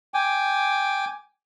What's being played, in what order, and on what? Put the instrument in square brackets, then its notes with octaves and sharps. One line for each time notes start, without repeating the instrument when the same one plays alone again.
[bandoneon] G5 G#5 D6